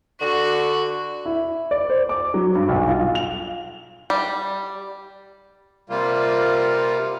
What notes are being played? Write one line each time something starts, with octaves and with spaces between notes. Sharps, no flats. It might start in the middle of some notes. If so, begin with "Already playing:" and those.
D3 F#4
E4
D5
C5
D6
F#3
G2
B1
F4
F7
G3
C3 G3 A#3 F4